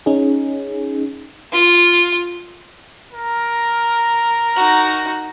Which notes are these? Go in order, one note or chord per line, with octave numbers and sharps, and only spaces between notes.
C#4 D#4 G#4
F4
A#4
D#4 F#4